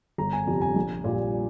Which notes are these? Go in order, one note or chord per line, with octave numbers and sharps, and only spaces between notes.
G1 A#5
G#5
F2 C3 G3
G#5
A#1
A#2 G3